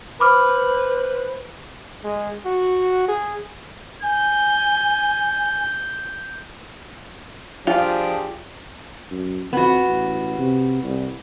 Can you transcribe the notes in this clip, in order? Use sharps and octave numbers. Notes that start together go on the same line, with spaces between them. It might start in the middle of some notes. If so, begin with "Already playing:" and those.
B4 C5 B5 D6 F6
G#3
F#4
G#4
G#5 G6
F3 D4 F4 G4 G#4
F#2
F2 B3 F#4
A1
C3
C2